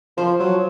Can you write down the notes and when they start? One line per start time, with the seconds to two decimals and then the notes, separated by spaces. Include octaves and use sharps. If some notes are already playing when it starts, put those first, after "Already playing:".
0.17 F3 C5
0.40 F#3